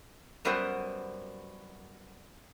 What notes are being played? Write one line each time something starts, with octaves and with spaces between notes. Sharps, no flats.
F#2 G3 B3 F#4 A#4 C5